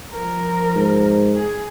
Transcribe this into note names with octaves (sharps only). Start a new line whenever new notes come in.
F3 A#4
G#2
G#4